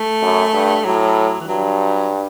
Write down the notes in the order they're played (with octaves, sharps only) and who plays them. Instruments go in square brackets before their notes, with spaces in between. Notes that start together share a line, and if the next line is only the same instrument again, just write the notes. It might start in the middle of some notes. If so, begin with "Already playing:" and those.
Already playing: [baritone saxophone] A3
[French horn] F#2
G2
[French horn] A2 [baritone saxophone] F#3
[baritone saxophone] E3
[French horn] G2 [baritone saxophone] F#3